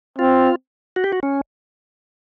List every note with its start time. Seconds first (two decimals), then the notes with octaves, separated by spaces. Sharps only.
0.18 C4 F4
0.96 F#4
1.04 G4
1.13 F#4
1.23 C#4